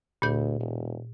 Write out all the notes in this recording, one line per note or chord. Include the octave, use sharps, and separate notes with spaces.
D2 A#2 G6
E1